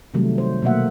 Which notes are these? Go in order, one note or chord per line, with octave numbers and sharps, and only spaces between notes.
C3 D#3 F#3 G3 A3
C5
B2 F#3 A3 A#3 E5 F#5